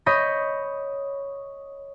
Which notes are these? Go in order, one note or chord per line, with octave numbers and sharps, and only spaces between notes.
C#5 D#5 B5 G6 A#6